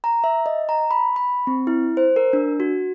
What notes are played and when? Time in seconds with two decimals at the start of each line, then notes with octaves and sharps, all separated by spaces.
0.04 A#5
0.24 E5
0.46 D#5
0.69 A#5
0.91 B5
1.16 B5
1.47 C4
1.67 E4
1.97 C5
2.16 A#4
2.33 D4
2.60 F#4